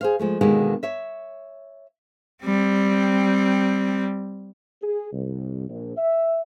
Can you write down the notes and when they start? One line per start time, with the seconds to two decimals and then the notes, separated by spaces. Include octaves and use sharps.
0.01 G#4 C5 F5
0.19 F3 G#3 A3
0.41 D#2 B2 D3 D#3 G#3 G4
0.83 C#5 E5
2.43 G3 C4
4.82 G#4
5.12 C2
5.68 A#1
5.97 E5